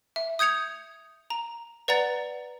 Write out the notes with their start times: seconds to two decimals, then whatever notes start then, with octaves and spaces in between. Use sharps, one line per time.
0.16 E5
0.39 D#6 G6 G#6 C#7 F7
1.30 A#5
1.88 B4 D5 F#5 A#5 A6